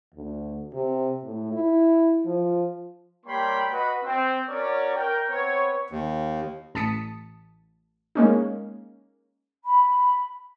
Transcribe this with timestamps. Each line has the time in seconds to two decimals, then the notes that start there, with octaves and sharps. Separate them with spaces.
0.14 D2
0.73 C3
1.23 A2
1.52 E4
2.26 F3
3.26 G3 A#3 C#5 G5 B5 C6
3.70 F#4 B4 D#5 B5
4.04 C4
4.49 C#4 F#4 A#4 C#5 D5
4.96 A#4 G5
5.29 B3 C4 B4 C#5
5.90 D#2
6.75 A1 A5 D#6 B6 C#7
8.15 G#3 A#3 C#4 D#4
9.65 B5